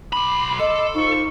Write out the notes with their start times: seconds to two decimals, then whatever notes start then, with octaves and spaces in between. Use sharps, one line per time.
0.13 B1 B5 C6 D6
0.60 A4 D#5
0.94 D#4 F4 C5 C#6